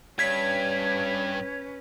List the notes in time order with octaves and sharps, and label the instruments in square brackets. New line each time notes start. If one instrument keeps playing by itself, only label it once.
[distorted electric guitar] G2 [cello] C#4 B4 [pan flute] C#5 [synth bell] G#6 B6